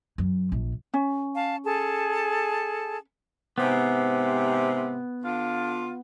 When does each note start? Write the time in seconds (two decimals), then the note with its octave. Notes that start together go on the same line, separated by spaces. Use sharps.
0.18 F#2
0.52 A#1
0.94 C#4
1.35 F5 A5
1.64 G#4 A4 A5
3.58 G#2 C3 B3
5.25 D3 F4